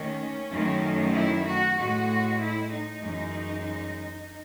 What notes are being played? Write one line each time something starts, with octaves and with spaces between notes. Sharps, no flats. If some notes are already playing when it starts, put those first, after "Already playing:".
Already playing: D#2 D#3 A3 C#4
F#2 D#3 A3
E4
F#4
A2 G#3 F#4
E4
D#4
F#2 E3 G#3